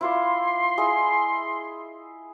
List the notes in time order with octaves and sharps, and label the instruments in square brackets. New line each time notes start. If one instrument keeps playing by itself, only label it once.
[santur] E4 F4 D5 [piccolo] C6
[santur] E4 G#4 D#5